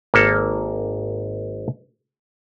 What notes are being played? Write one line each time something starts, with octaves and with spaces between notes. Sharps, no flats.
G#1 A#3 A4